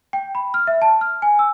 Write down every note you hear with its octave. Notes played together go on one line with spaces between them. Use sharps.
G5
B5
F6
E5
A5
F6
G#5
E6